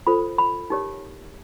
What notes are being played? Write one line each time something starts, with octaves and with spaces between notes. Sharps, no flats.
F4 A4 C5 B5
B5
D#4 G4 A#4 C#5